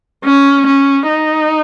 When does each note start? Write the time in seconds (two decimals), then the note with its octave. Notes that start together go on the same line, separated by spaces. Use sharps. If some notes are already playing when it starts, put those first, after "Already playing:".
0.25 C#4
0.67 C#4
1.09 D#4